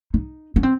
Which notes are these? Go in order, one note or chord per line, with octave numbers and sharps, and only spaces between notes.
D#4
C#4
C4